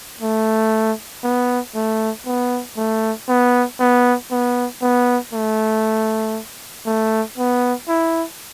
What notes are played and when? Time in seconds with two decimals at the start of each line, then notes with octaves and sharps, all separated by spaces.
0.21 A3
1.24 B3
1.75 A3
2.26 B3
2.77 A3
3.29 B3
3.80 B3
4.31 B3
4.82 B3
5.33 A3
6.86 A3
7.38 B3
7.88 E4